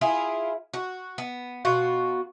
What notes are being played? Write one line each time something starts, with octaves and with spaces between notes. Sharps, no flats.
E4 F4 G#4
F#4
B3
B2 F4 F#4